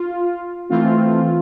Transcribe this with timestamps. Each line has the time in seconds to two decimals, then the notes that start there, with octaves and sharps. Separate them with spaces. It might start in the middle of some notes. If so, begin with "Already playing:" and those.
Already playing: F4
0.70 E3 A3 C4 F4